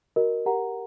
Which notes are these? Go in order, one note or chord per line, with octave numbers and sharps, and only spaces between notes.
F#4 A#4 D#5
G4 A#4 F#5 A#5